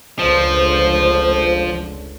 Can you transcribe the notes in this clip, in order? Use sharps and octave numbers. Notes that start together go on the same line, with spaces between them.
F1 C#2 D3 F3 C5